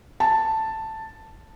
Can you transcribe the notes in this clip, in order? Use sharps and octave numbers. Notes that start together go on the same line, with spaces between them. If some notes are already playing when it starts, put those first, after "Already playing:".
A5